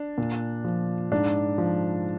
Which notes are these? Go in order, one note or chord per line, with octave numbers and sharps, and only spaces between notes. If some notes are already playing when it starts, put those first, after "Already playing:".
Already playing: D4
A#2
F3
G#2 D4
F3